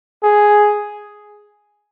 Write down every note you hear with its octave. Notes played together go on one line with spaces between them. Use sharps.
G#4